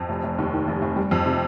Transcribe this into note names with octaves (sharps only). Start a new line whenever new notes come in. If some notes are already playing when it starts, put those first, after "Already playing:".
Already playing: F2
F1
F1
D#2
D#3
F1
F1
G3
F2
C3